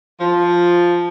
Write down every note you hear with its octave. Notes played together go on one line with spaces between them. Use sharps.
F3